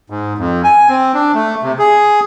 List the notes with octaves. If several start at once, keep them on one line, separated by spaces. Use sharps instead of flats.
G#2
F2
G#5
C4
D4
A3
C3
G#4